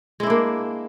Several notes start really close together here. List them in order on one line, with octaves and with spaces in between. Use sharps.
G#3 E4 D4 A#3